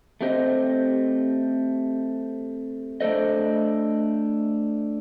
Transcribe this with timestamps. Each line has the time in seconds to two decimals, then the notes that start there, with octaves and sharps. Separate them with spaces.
0.21 A3 C4 G4 C5 D#5
3.01 A3 D4 A4 C5 D#5